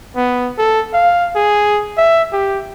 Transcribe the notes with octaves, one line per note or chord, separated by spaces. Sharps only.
B3
A4
F5
G#4
E5
G4